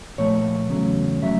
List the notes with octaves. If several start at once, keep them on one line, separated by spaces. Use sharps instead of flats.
A#2 F3 A3 C#5
E2 C#3 F#3 A3
C#3 F#3 A3 E5